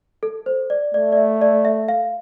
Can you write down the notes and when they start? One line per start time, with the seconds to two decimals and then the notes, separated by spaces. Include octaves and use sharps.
0.23 A4
0.46 C5
0.70 D5
0.94 A3 D5
1.12 D5
1.17 E5
1.42 D5
1.65 E5
1.88 F5